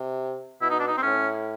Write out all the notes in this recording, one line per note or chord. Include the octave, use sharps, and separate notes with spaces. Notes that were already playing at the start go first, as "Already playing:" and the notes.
Already playing: C3
B2 E4
D#4
D4
D#4
C4
A2 C#4